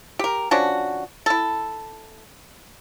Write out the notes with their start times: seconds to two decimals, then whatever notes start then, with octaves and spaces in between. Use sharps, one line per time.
0.19 G4 A#4
0.51 F3 C#4 D4 F#4
1.26 E4 A4